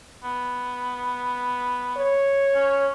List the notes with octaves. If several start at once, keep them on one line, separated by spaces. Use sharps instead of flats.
B3
C#5
C#4